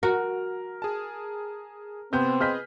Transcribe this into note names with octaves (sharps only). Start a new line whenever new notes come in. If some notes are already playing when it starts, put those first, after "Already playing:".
F#4 A#4
G#4 A5
C3 B3 C4 G6
G#4 B4 D#5 F6 G6 B6